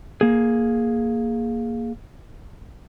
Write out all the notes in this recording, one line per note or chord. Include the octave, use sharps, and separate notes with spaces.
A#3 G#4